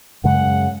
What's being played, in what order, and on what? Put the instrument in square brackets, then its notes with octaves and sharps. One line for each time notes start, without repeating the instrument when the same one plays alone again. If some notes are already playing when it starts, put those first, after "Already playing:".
[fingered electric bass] F#2 C#3 G#3 [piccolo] F#5